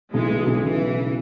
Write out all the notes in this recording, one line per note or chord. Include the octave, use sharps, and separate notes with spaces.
B1 E3 G#3
B2
B1
C#3 E3
F#3
C#3